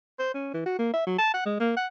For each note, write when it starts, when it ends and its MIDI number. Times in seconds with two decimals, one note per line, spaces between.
0.19 0.34 72
0.34 0.50 61
0.54 0.61 52
0.66 0.76 66
0.79 0.91 58
0.93 1.04 76
1.06 1.17 54
1.18 1.29 81
1.34 1.44 78
1.46 1.57 56
1.60 1.74 58
1.77 1.87 78